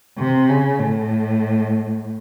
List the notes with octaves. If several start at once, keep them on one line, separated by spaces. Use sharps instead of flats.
C3
C#3
A2